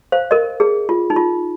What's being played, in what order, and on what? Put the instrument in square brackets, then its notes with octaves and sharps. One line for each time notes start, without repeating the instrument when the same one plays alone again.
[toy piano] C5 F5
A#4 D#5
G#4
F4
D#4
F4